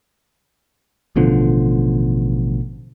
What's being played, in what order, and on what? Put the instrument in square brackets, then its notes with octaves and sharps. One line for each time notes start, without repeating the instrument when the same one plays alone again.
[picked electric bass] A1 B2 D3 F3